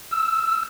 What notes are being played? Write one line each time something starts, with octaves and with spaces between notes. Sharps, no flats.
E6